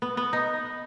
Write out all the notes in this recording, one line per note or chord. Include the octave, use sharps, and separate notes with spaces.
B3
B3
D#4